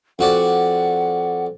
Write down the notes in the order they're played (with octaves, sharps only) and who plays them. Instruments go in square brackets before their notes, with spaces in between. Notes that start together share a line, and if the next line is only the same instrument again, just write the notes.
[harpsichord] F2 F#4 D5 [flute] F#5